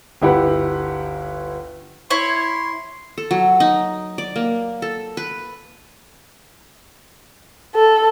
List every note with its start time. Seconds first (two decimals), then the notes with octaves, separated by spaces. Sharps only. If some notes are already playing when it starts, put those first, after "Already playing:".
0.22 G1 D2 E4 G4 B4 F#5
2.10 E4 C#5 C6
3.18 A4
3.31 F#3
3.60 D#4
4.18 D5
4.36 A#3
4.82 A4
5.17 B4
7.75 A4